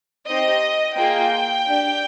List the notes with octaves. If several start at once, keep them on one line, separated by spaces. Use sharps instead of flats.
C4 D#4 G4 D#5
A#3 F4 G#4 G5
D4 G4